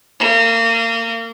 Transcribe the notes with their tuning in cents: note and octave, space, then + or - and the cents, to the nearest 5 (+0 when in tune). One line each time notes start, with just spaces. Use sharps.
A#3 -30